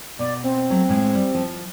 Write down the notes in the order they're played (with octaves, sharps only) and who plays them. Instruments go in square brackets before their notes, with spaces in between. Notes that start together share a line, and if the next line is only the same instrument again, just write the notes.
[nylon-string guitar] B2 [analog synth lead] D5
[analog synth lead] C4
[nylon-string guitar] F#3 A3
A2 G#3
G3
F3